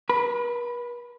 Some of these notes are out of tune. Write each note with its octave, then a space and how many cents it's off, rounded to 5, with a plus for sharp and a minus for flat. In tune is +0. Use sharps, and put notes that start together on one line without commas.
B4 -45 B5 +0